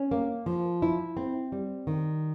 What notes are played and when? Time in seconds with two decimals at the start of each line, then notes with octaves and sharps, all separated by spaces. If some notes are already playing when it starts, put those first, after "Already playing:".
Already playing: C#4
0.11 A#3
0.46 F3
0.82 E4
1.17 C4
1.52 G3
1.87 D#3